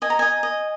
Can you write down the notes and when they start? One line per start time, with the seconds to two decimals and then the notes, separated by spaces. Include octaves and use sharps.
0.02 D#5 G#5
0.10 A#5
0.19 D#5 G#5
0.43 D#5